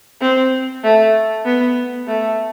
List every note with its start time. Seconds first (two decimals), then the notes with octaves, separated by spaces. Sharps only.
0.21 C4
0.84 A3
1.45 B3
2.07 A3